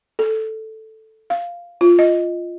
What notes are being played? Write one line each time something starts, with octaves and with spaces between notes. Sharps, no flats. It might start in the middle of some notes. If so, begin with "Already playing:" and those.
A4
F5
F4
D#5